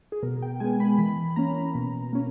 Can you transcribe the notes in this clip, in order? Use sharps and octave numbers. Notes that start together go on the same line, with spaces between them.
G#4
B2 A#4
G5
G#3 B3 G#5
B5
E3 B5
A#3 C#4 A#5
B2
A#3 C#4